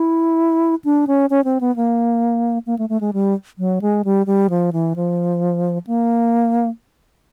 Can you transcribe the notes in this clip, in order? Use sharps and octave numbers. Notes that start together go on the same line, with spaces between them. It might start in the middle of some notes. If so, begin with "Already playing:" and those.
Already playing: E4
D4
C#4
C#4
C4
B3
A#3
A#3
A3
A3
G#3
G3
F#3
G#3
G3
G3
F3
E3
F3
A#3